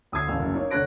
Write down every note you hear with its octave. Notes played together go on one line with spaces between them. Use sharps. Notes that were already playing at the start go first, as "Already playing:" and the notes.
D2 D#6 E6 G#6 C7
A1 D2 A4 F5 E6
F#1 F#2
A#3 D#4 C#5
F1 D3 C#5 F#6 A#6 D7